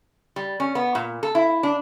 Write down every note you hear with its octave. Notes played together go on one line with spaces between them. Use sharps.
G3
C#4
B3
A#2
A4
E4
D4